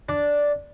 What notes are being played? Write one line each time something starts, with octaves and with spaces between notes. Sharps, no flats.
D4